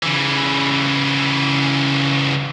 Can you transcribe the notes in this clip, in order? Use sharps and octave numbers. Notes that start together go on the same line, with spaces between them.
C#3 E3